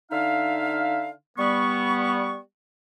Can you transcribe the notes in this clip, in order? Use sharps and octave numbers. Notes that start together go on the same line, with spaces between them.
D3 D#4 E5 F5
G3 B3 C#6